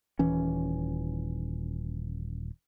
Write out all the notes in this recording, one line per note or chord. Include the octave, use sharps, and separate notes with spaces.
D#1 E3 C#4